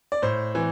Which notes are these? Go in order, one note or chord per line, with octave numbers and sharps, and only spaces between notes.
D5
A2 C5
E3